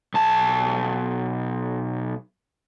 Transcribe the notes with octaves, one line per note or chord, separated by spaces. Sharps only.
B1 A5